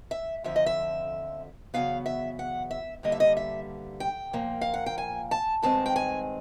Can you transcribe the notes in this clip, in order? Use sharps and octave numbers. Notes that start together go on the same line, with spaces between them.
E5
F2 D3 F3 E5
D#5
E5
E2 C#3 F#3 B3 F5
E5
F#5
E5
G2 D3 G3 A#3 D#5
E5
D#5
E5
G5
A#2 F3 A#3
F5
F#5
G5
G#5
A5
G2 D#3 G#3 C4 A5
G5
G#5